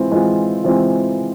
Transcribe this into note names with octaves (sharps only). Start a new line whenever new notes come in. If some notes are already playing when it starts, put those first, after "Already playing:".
Already playing: E3 G#3 C4 F4
E3 G#3 C4 F4
E3 G#3 C4 F4